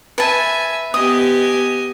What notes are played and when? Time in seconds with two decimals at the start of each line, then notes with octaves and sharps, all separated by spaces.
0.18 B4 E5 G#5 A5
0.94 B3 G4 D#5 G#5 D#6